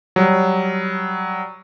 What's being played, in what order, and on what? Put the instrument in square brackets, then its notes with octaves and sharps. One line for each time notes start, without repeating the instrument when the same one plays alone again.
[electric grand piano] F#3 G3